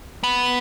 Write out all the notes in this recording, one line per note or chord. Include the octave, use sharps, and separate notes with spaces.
B3